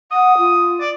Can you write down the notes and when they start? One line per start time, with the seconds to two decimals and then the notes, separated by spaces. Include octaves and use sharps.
0.12 F#5 D#6
0.37 F4
0.80 D5